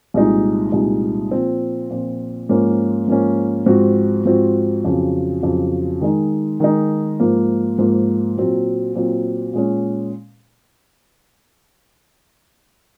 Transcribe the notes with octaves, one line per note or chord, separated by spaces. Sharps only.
C2 A#2 G#3 D#4
C2 A#2 G#3 D#4
A#2 F3 C4
A#2 F3 C4
G#2 F3 A#3 C#4
G#2 F3 A#3 C#4
G#2 F3 C4 F#4
G#2 F3 C4 F#4
F2 C#3 F#3
F2 C#3 F#3
D#3 G#3 D#4
D#3 G#3 D#4
G#2 F3 A#3
G#2 F3 A#3
A#2 F#3 C4
A#2 F#3 C4
A#2 G#3 C#4